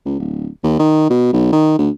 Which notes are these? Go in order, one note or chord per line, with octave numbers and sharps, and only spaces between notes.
C#2
D1
D#2
D#3
B2
B1
D#3
D2